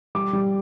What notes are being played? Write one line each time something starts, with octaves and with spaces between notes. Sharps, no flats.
G3 D6
G3